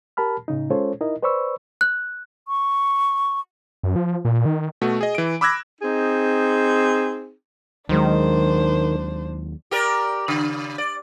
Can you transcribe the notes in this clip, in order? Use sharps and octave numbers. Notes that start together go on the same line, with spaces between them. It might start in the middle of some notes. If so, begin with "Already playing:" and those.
G4 A#4 A5 B5 F6
A2 C#3 D#4
G#3 C#4 F4 A4 C5 C#5
D#4 E4 A#4 D#5
B4 C5 D5 B5 C#6 E6
F#6
C#6
F#2
F3
A#2
D#3
B2 A3 F#4
G#4 D#5
E3 D7
B5 D6 E6 F#6 G#6 A#6
C4 D#4 G#4
D#2 D#3 F#3 G#3 D4 C5
G4 A#4 D5
C#3
D5